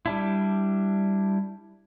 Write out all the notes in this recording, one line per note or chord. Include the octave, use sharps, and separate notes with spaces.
G3 D4 E4